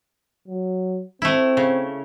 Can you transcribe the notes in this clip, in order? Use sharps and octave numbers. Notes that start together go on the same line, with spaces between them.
F#3
A3 C4 E4
C#3